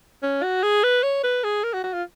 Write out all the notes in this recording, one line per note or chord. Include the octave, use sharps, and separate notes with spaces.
C#4
F#4
G#4
B4
C#5
B4
G#4
A#4
F#4
F#4
F4